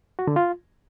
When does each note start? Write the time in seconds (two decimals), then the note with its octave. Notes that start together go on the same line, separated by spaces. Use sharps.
0.19 F#4
0.27 D3
0.36 F4